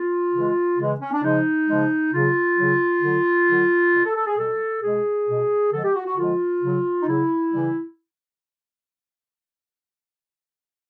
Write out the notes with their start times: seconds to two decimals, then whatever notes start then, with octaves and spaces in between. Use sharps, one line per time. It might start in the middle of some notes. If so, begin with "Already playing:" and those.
Already playing: F4
0.33 C#3 E3 G#3
0.78 C#3 E3 G#3
1.00 C#4
1.12 D4
1.23 C#3 F3 G#3 D#4
1.67 C#3 F3 G#3
2.12 C#3 F#3 F4
2.57 C#3 F#3
3.02 D3 F#3
3.48 D3 F#3
3.93 B2 G3
4.04 A4
4.15 A4
4.26 G#4
4.37 B2 G3 A4
4.82 B2 G#3 G#4
5.28 B2 G#3
5.72 D3 F3 G#3 A4
5.83 G4
5.95 F#4
6.05 F#4
6.17 D3 F3 G#3 F4
6.62 C#3 F#3
7.02 D#4
7.07 C#3 F#3 E4
7.52 C#3 E3 G3